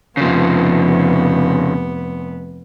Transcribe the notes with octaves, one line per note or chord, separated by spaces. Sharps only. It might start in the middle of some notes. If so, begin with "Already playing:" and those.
F1 C#3 F3 B3